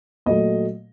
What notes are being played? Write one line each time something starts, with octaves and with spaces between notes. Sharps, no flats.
A#2 F#3 A3 D#5